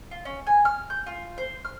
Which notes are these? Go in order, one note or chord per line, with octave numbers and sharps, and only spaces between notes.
F4
C#4
G#5
F6
G6
F4
C5
F6